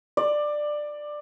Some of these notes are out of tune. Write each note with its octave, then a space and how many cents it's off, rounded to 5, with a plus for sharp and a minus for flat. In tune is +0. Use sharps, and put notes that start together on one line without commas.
D5 +15